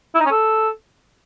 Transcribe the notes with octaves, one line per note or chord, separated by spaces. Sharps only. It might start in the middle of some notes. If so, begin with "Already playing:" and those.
E4
D#4
C#4
A4